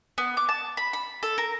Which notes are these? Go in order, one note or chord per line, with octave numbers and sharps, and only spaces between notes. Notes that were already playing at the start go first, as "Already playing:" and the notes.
B3
D6
A5
B5
B5
A4
A#4